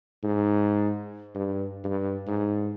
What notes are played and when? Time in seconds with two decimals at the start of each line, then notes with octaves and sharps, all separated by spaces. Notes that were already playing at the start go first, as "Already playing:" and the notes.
0.23 G#2
1.35 G2
1.84 G2
2.27 G#2